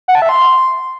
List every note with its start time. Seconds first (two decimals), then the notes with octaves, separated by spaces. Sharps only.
0.08 F#5
0.15 A5
0.22 E5
0.29 C6